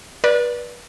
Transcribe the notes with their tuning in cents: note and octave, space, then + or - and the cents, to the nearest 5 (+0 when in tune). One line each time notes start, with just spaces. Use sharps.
B4 -30 D5 +0